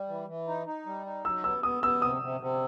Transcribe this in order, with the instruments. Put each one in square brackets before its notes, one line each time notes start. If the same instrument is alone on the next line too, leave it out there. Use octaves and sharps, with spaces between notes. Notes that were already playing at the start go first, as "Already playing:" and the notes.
Already playing: [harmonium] G3
E3
E3
D#4
D#4
G3
D#4
[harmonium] F#3 [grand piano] E6
[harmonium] B3 [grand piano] E6
[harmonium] B3 [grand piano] D#6
[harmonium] B3 [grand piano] E6
[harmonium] C3 [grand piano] D#6
[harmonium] C3
C3